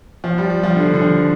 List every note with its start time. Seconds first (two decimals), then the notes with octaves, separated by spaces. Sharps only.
0.24 F3
0.38 G3
0.50 G3
0.63 F3
0.76 D3
0.94 D3
1.01 F3